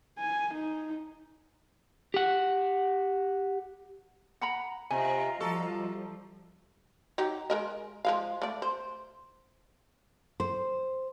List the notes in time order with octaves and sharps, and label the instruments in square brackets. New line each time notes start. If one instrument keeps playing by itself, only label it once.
[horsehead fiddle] G#5
D#4
[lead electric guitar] G4 F#5
[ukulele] F#5 A#5 B5
[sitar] C3 [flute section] F4 D#5 A#5 [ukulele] G#5
[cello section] F3 G3 [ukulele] F#4 [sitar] A4
[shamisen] F#3 D#4 G4
G#3 A#4 D#5
F3 G#3 F5
A3 D5
C5
[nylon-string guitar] C5